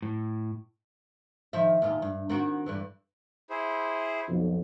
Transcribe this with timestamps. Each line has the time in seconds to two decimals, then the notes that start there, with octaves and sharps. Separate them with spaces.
0.02 A2
1.53 D#3 F3 E5
1.82 D#2 A#2 F4
2.02 G2
2.30 D#3 C4 F#4
2.66 G2 D3 E3
3.50 E4 G#4 C5
4.28 B1 F2